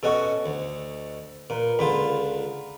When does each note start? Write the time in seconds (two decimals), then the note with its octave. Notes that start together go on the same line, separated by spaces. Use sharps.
0.03 B2 C#4 F#4 A4 D#5 C#6
0.46 D2
1.50 A#2 A#4 B4
1.79 C#2 D3 F4 B5